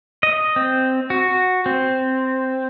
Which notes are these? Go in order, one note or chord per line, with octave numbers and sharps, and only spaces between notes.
D#5
C4
F#4
C4